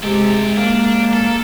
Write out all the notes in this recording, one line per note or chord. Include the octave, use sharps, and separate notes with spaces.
C3 G#3 G4 A4
A#3 D4
A4